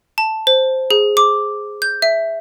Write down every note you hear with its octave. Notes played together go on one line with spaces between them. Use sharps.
A5
C5
G#4
D6
G6
E5